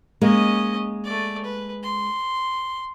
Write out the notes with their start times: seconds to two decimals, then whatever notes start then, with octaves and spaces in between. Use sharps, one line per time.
0.21 G#3 A#3 C#4 D#5
1.04 A3 D5
1.45 B4
1.83 C6